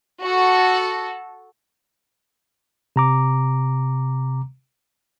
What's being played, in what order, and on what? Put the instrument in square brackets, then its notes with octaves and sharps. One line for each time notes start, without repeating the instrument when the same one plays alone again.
[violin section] F#4 A4
[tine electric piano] C3 A#5 D6